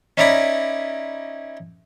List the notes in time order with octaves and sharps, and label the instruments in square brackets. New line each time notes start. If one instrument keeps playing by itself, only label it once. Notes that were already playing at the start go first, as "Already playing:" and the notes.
[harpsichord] C#4 D#4 E4 D5 A#5 B5